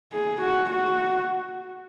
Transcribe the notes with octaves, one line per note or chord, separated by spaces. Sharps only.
G#4
F#4
F#4